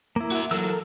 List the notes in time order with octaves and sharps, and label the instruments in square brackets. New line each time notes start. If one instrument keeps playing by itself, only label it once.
[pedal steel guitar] A#3 E4
[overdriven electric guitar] F#4 E5
[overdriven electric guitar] E3 F#3 [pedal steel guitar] A4 A#4 E6